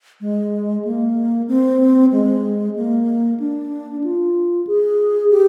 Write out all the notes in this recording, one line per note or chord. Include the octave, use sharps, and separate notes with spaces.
G#3
A#3
C4
G#3
A#3
D4
F4
G#4
G4